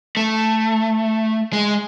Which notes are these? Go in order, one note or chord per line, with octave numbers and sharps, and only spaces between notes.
A3
G#3